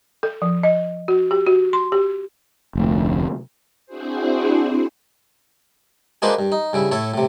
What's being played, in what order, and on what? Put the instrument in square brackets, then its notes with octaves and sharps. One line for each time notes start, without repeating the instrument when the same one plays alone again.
[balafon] A4
F3
D#5
F#4
G4
F#4
C6
G4
[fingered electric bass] F1 D2
[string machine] C4 D4 E4 F#4 G#4 C5
[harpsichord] G#3 A#3 D4 F#4 B4 C5
G2
D#4
G2 C#3 E4
A2 E4 A4 C#5
A2 C3